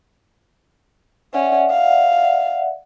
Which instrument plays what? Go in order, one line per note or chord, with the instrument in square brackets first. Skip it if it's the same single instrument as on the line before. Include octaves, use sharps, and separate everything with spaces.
[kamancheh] C#4 [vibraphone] D5 E5 F#5
[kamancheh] F5